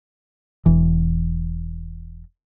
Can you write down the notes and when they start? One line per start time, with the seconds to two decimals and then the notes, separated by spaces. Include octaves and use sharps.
0.66 E1 E3